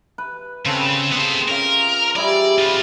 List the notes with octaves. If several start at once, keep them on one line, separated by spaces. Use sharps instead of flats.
B4
C#3 C4 A4
B3 G#4 C5
C#4 F4 A#4
G3 E4 G#4 D5
G3 F4 G4